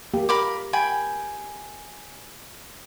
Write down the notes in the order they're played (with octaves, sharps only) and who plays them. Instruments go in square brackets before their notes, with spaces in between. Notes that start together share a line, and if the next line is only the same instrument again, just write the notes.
[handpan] A#3 G4
[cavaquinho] A#4 B5 D6
G5 G#5 B5